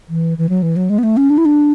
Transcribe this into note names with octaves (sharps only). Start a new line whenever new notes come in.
E3
E3
F#3
E3
F#3
G#3
B3
A3
C#4
D4
E4
D4